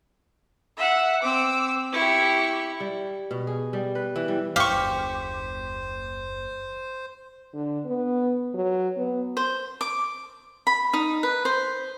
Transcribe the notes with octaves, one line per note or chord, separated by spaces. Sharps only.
E5 F#5
C4 D6 E6
E4 G4 C#6
G3
B2
G#4
G3
B4
E3
G3
F#1 D#2 G4 C5 F5 C#6
D3
B3
F#3
B3
C5
D6
B5
D#4
B4
C5